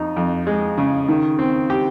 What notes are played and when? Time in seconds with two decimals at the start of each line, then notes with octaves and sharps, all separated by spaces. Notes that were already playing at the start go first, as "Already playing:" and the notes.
Already playing: F2 D#4
0.16 F2
0.47 G#3
0.78 C#3
1.08 D#3
1.39 C4
1.70 G4